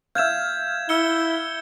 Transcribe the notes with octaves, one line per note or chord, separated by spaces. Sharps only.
E5 F5 G6 G#6 E7
E4 E6 C#7 G7